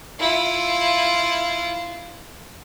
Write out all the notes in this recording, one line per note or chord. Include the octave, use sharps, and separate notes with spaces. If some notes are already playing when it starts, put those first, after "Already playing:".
E4 F4